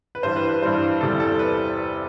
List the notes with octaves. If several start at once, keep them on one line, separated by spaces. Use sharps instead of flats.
B4
G2 E3 G3 C5
B4
B4
G2 E3 G3 C5
E2 C3 G3 A4
A4
B4